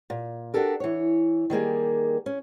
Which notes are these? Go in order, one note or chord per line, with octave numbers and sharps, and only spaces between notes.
A#2
D4 F#4 G4 A4 A#4
E3 C#5
D#3 G3 A#3 G#4
C#4